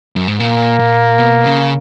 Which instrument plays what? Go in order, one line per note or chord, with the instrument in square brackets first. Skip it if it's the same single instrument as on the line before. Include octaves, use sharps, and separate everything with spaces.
[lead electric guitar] F#2
G#2
[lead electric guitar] A#2 [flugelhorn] A#3
[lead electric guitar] A#2
B2
C#3